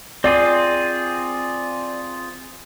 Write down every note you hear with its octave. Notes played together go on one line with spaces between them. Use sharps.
C4 F4 G#4 D5